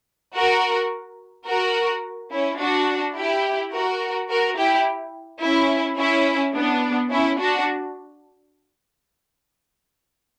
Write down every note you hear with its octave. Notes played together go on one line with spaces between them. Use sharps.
F#4 A#4
F#4 A#4
C#4 E4
D4 F#4
E4 G4
F#4 A#4
F#4 A#4
E4 G4
C#4 E4
C#4 E4
B3 D4
C#4 E4
D4 F#4